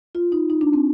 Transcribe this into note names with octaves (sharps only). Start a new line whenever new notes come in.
F4
D#4
D#4
D4
C4